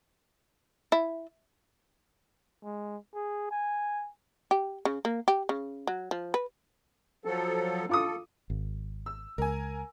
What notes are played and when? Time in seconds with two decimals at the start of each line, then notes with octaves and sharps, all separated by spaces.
0.92 E4
2.64 G#3
3.14 G#4
3.51 G#5
4.51 G4
4.85 C#3
5.05 A#3
5.28 G4
5.49 C#3
5.87 F#3
6.11 F3
6.34 B4
7.25 F3 F#3 A4
7.89 F4 A4 D6 D#6
8.50 G#1
9.06 E6
9.38 C#2 A#4 G#5